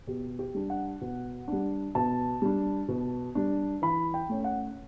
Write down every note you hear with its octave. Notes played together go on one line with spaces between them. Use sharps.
B2 G4
G4
G3 D4
F#5
B2
G3 D4
B2 A5
G3 D4
B2
G3 D4
E3 B5
G5
A3 C#4
F#5